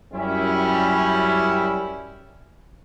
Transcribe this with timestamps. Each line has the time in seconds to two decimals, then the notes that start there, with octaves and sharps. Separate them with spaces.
0.13 F#2 G3 C#4 E4